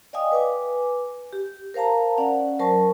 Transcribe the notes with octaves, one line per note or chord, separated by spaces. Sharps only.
D5 D#5 F5 G5 G#5 D#6
B4 G#5 D6
G4
A#4 C5 F5 A5 A#5
C#4 D5 F#5
F#3 A#4 C5 A5 C#6